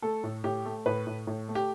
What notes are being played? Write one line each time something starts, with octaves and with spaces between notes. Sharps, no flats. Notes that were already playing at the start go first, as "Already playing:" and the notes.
A3 A4
A2
A2 G4
A3
A2 B4
A2
A2
A3
G4